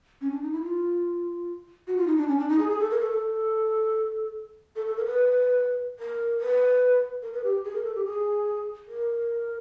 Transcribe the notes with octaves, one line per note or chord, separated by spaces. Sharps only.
C#4
D4
D#4
E4
F4
F#4
F4
D#4
D4
C#4
D4
D#4
G#4
G#4
A4
A#4
A4
A4
A4
A4
A#4
B4
A#4
B4
A#4
B4
G4
G#4
A#4
A4
G4
G#4
A#4